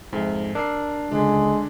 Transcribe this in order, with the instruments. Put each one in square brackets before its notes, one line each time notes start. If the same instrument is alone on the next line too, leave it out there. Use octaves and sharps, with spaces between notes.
[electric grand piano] F2 E5 [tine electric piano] G#2
[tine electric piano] D4 [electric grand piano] A#4 E6 C7
[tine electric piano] C#2 [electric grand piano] D3 D4 [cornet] G#3